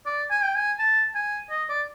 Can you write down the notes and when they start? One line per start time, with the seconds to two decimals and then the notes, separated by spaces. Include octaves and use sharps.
0.06 D5
0.30 G#5
0.43 G5
0.55 G#5
0.79 A5
1.15 G#5
1.50 D#5
1.69 D5